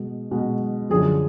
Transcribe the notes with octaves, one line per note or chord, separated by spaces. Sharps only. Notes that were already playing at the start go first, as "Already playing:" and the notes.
Already playing: B2 G#3
B2 G#3
F#2 D3 F3 G#4